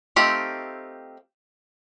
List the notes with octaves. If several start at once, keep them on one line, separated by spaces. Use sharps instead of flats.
A3 C4 D#4 F4 G4